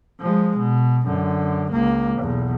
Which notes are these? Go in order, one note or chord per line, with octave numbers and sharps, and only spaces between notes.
F3 G#3
B2
F#2 D3
C#2 A#3
B1 E2